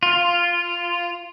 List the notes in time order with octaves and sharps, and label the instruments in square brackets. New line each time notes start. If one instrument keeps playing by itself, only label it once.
[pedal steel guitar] F4